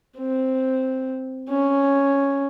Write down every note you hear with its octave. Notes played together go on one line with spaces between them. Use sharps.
C4
C#4